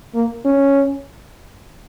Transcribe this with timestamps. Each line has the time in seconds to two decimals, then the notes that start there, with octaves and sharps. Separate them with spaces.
0.15 A#3
0.45 C#4